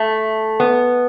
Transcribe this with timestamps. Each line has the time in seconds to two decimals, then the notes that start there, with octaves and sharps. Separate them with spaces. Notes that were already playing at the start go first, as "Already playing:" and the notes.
Already playing: A3
0.60 B3